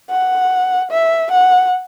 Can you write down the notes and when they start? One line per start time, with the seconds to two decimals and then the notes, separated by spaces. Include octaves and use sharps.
0.10 F#5
0.91 E5
1.31 F#5